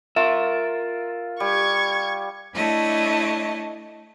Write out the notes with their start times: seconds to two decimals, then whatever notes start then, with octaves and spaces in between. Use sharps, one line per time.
0.16 F4 A#4 E5
1.40 G3 C#6 G#6
2.53 A3 D4 E4 C#5 D#5 A5